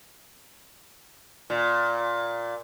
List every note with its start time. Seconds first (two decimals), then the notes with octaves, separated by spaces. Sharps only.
1.50 A#2